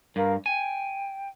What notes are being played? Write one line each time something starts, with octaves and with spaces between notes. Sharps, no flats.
G2 A#4 F5
G5 G#5